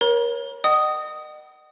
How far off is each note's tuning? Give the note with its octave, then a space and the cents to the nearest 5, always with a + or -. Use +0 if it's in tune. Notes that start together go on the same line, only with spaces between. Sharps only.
A#4 +25 C#5 -15 A#5 +40
D#5 -40 F#5 +40 D#6 +0